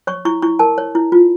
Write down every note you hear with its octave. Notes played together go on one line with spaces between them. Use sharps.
C#5 C#6
E4 C#6
E4 C#6
A#4 A5
C#5
E4
F4